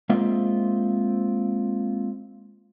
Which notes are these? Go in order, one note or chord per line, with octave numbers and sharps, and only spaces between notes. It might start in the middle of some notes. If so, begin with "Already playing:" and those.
G#3 A#3 C4 F4 D#5 E5